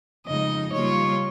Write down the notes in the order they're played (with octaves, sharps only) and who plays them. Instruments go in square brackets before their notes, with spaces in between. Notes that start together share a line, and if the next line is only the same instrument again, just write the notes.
[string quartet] F2 C#3 G#3 D#4 [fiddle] D#5
[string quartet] C#3 G3 A#3 F4 [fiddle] C#5